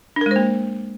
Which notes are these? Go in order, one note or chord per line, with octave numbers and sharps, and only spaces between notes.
G#3 A#3 D4 A#4 C5